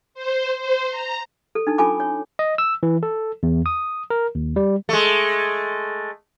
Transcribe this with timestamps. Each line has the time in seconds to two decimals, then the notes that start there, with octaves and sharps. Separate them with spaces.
0.14 C5
0.59 C5
0.91 A#5
1.55 A4
1.67 D4 D#4 A4
1.78 C#4 F4 A4 G#5 B5 D6
2.00 C#5
2.39 D#5
2.58 E6
2.83 E3
3.03 A4
3.43 E2
3.66 D#6
4.10 A#4
4.35 D#2
4.56 G3
4.89 G#3 A3